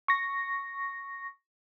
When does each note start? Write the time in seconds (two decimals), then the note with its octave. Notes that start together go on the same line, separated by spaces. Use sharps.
0.08 C#6 A#6